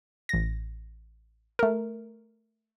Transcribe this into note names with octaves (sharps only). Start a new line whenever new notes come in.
A1 A#6
A3 A#4